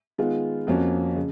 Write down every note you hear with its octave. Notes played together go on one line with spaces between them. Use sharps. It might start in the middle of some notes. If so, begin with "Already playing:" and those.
D#3 G#3 B3 F4
F2 F3 A#3 C#4 F#4
C#3